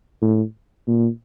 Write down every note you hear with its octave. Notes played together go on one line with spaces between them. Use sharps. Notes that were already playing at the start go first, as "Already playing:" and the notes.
A2
A#2